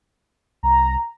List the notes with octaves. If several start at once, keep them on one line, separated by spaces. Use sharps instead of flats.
C2 A#5